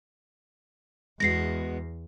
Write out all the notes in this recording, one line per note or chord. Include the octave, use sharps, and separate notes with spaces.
E2 G#3 B3 F#4 A#6 C7